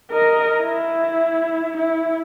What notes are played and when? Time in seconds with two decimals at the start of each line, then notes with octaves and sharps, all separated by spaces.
0.11 A#4 D#5
0.62 E4
1.77 E4